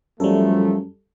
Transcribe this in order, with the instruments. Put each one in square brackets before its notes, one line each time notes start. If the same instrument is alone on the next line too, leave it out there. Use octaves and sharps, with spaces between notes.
[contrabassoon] F#2 [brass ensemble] F3 A3 [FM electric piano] G3 A4